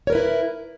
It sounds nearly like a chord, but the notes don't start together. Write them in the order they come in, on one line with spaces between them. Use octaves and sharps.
C#5 A#4 B4 E4